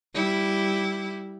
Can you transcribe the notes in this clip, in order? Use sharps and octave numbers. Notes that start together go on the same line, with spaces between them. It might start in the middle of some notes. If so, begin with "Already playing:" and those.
G3 E4